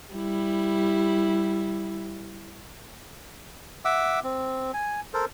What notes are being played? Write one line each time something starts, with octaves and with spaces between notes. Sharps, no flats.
G3 E4
E5 F#5 D6 E6
C4
G#5
A4 A#4 C5